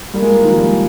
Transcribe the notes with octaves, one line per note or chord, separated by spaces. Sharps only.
G3 A#3 F4 A#4 D5
G#3
G3
D#3
F3
G3
G#3